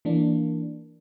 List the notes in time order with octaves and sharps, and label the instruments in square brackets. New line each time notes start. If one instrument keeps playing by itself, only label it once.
[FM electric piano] E3 A#3 D4